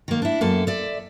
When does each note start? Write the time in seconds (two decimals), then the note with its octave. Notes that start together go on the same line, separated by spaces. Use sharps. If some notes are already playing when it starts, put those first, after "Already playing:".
0.08 D#3 A#3
0.22 D4 E4
0.41 F#2 A#3 A4
0.67 D5 E5